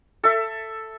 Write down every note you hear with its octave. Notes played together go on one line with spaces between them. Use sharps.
A4 E5